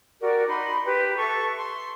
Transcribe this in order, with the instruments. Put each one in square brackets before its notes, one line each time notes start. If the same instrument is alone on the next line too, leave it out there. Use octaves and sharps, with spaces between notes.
[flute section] F#4 G4 A#4 D5
D#4 B5 C6
G4 B4
A4 E5 A5 C#6
C6